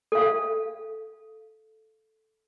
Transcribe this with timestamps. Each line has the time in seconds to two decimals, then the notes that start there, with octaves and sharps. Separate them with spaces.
0.12 A4 F5